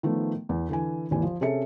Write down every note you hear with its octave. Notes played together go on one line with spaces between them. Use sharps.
D#3 F3 A3 B3
E2
D3 E3 G#5
G#1 D#2 E3 G#5
F3
C3 C#4 G#4 A4 E5 C#7